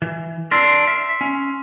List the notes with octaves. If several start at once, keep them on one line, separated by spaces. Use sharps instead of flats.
E3
D4 A#4 C6 E6 C7
E5
C#4